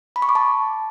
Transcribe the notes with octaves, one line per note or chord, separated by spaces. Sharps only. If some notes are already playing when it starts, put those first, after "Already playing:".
B5
C#6
D6
A5